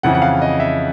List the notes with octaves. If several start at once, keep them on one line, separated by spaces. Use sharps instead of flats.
F2 C#3 E3 F#5
F#5
F5
D#5
E5